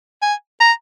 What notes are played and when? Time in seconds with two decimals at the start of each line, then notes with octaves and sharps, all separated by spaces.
0.22 G#5
0.60 A#5